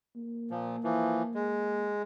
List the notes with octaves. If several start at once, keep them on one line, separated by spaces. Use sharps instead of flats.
A#3
A#2 F3
E3 F3
G#3